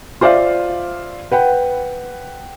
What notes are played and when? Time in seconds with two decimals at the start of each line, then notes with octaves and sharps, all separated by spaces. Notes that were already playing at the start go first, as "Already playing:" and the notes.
0.21 F4 C5 D5 E5 F5
1.32 B4 F#5 G5